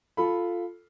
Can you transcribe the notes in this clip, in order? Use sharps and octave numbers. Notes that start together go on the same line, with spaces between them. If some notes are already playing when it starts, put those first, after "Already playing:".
F4 A4 B5